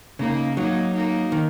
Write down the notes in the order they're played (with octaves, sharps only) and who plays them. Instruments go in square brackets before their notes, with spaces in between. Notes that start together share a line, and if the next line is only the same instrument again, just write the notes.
[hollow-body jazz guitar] C#3 [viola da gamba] A#3 D#4
[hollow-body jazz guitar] F#3 [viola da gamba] A#3 D#4
[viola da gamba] A#3 D#4
[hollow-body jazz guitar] D#3